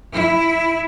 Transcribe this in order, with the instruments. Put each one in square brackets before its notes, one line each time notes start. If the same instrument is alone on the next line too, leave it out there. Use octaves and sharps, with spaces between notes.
[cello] E4